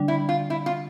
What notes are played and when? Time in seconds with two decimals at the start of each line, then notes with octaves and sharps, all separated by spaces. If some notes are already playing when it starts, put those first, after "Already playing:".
Already playing: D3 G3 D4
0.08 E4
0.29 F4
0.50 E4
0.66 F4